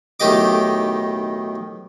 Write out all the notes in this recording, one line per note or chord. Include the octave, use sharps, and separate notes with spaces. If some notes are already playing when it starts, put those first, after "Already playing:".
B1 A2 D#3 G4 D#5 D6